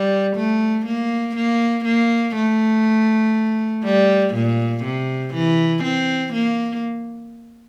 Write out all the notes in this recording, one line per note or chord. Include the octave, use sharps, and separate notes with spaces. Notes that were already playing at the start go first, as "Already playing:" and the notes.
Already playing: G3
A3
A#3
A#3
A#3
A3
G3
A#2
C3
E3
C4
A#3